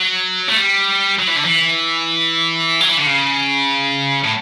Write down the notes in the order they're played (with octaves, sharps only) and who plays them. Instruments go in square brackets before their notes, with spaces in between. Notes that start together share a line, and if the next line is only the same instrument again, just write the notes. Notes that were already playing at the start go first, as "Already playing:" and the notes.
Already playing: [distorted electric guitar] F#3
A3
G3
F#3
E3
D3
E3
F#3
E3
D3
C#3
A2